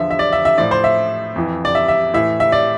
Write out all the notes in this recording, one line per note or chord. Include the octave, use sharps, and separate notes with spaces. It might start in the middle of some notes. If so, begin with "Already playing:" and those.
Already playing: E2 D3 F3 E5
E5
D5
E5
E5
A2 F3 D5
C5
E5
F2 E3
D5
E5
E5
A2 E3 E5
E5
D5